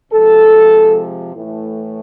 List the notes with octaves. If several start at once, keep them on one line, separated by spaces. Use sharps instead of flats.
C3 F3 G#3 A4
A2 E3 A3